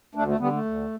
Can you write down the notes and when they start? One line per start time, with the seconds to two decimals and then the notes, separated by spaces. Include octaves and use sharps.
0.15 D2 A3 D4
0.28 A3
0.39 D3 G3 B3
0.52 A3
0.65 D2